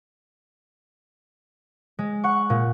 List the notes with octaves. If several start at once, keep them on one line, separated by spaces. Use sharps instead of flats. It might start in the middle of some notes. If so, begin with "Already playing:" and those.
G#3
F#5 C#6
A#2